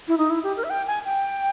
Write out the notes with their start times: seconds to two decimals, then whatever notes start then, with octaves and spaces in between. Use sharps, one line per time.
0.08 E4
0.18 D#4
0.30 E4
0.44 G4
0.57 A#4
0.64 E5
0.70 G5
0.87 G#5
1.05 G5